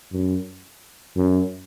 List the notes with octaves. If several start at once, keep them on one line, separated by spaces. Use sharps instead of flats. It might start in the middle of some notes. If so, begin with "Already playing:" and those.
F#2
F#2